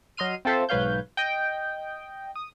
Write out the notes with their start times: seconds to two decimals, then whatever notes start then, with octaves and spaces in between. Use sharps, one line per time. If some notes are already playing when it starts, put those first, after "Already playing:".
0.17 F#3 D#5 C6 F6 D#7
0.45 C4 F4 A4 C5 E5
0.69 B1 G#2 B4 C#5 F5 G6
1.17 D#5 G5
2.35 D#6